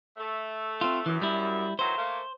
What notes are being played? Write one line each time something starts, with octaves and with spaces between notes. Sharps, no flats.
A3
C4 F4
F#2 E3
G3 E4
D#3 E3 F#3 C5
A3 A#3